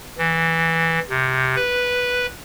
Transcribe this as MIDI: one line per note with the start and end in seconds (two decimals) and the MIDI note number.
0.18 0.99 52
1.10 1.55 48
1.56 2.26 71